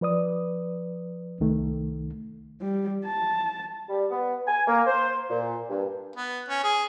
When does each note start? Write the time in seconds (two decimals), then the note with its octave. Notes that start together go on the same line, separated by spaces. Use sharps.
0.01 F3 B4 D5 D#6
1.40 C2 D#3 A3
2.61 G3
3.06 A5
3.89 G3
4.11 B3
4.47 G#5
4.67 A#3
4.87 C5
5.30 A#2
5.69 G2
6.16 B3
6.49 C#4
6.63 G#4